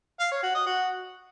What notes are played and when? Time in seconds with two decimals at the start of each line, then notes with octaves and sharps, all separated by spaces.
0.20 F5
0.31 C#5
0.43 F#4
0.55 D#5
0.66 F#4